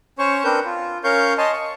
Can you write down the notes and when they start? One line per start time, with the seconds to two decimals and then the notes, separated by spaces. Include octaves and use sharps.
0.19 C#4 C5 C#5 C#6
0.44 C4 D4 A#4 B4 G6
0.65 F4
1.04 C#4 A#4 C#5 F5 C#6 G6
1.38 C#5 D#5 G#5 A5 C6
1.53 C#6